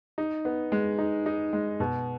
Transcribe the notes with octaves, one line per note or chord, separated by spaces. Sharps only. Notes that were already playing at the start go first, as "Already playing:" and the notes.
D#4
B3
G#3
D#4
D#4
G#3
B2